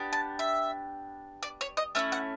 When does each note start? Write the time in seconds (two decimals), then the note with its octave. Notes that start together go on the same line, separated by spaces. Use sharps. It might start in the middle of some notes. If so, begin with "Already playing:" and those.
Already playing: B3 D4 G4
0.13 A5
0.39 E5
1.43 D5
1.61 C#5
1.77 D#5
1.95 A3 C#4 E4 E5
2.12 F#5